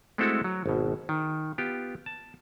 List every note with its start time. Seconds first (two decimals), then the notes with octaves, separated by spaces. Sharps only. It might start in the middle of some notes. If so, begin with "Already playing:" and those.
0.18 G#3 A3 C4 E4 F#4 A4
0.44 F#3
0.66 G#1 B2
1.09 D#3
1.58 B3 F4 G4
2.06 A5